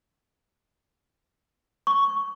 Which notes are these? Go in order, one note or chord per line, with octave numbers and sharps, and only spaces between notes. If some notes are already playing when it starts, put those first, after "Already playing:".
C#6